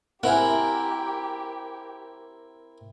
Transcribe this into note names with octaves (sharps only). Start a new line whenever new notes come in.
C4 E4 G4 A#4 F#5 G#5